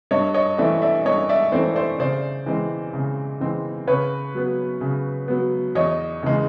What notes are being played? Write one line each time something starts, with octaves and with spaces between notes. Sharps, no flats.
G2 C#5 D#5
C#5 D#5
E3 A3 C4 D5 E5
D5 E5
G2 C#5 D#5
D5 E5
E3 A3 C4 C5 D5
C5 D5
C#3 C5 D5
E3 G#3 C4
C#3
E3 G#3 C4
C#3 B4 C#5
F#3 B3
C#3
F#3 B3
E2 C#5 D#5
C#3 E3 G#3